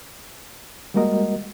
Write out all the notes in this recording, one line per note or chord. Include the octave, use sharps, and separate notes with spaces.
G3 G#3 A#3 F#4 A#4 D#5